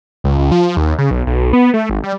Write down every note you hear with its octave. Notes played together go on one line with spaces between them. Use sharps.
C#2
C#2
F3
D#2
C#3
B1
B1
B3
A3
G#1
G3